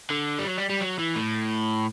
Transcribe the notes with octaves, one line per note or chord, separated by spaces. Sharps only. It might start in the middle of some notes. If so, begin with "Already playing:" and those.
D3
G3
F#3
G3
G3
F#3
E3
A2